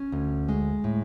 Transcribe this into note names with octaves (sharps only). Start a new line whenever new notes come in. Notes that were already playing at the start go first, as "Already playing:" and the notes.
Already playing: C#4
D2
G#3
A2